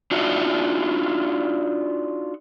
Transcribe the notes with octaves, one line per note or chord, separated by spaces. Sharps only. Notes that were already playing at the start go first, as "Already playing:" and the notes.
D4 D#4 F4 F#4 E5